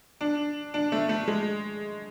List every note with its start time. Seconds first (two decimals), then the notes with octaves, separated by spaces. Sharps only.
0.21 D4
0.74 D4
0.92 A3
1.09 A3
1.28 G#3